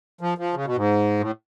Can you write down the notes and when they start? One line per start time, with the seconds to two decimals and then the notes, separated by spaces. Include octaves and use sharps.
0.21 F3
0.38 F3
0.54 C#3
0.65 B2
0.76 G#2
1.20 A2